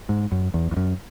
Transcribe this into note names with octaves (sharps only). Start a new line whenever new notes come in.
G#2
F#2
E2
E2
F#2